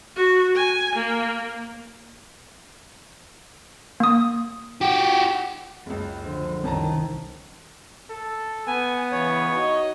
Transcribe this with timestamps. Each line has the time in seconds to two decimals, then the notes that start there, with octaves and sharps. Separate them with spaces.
0.16 F#4
0.55 G#5
0.95 A#3
4.00 A#3 D#6
4.81 F#4 G4
5.86 F#1 C#2
6.24 D3 F3
6.64 C2 F#2 D#3 A5 A#5
8.10 A4
8.67 B3 G#5
9.12 C#3 E3 C#5
9.51 D#4 F#4 D#5